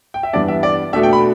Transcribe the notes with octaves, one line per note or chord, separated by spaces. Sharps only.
G5
E5
G2 E3 G3 B3 D4 D5
E5
D5
B2 A3 D4 E5
G5
B5